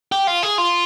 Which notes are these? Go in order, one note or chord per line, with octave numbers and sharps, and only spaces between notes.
G4
F4
G#4
F4